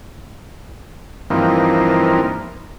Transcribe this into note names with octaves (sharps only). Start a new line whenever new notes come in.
G2 E3 F3 A#3 C4 D#4